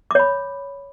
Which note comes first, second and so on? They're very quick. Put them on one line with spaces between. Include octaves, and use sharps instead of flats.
D6 C#5 B5